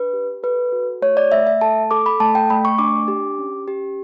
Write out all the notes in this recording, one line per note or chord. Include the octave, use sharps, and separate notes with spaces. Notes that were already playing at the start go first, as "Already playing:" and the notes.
Already playing: D4 B4
G4
A4 B4
F#4
A3 C#5
D5
A3 E5
E5
A4 A5
A4 D6
B5
A3 A5
G5
A3 B5
C#6
D4 D6
G4
C#4
G4